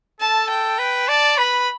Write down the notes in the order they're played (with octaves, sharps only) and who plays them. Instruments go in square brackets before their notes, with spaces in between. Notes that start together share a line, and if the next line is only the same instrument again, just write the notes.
[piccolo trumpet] A4 [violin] A5
[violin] G5
[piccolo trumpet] B4
[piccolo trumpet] D5 [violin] A5
[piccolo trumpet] B4 [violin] B5